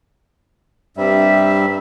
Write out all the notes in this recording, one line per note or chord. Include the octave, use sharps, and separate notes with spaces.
G2 C3 G3 C4 E5